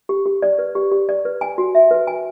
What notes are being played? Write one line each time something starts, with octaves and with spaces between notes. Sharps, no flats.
G4
G4
D5
B4
G4
G4
D5
B4
G#5
F#4
E5
B4
G#5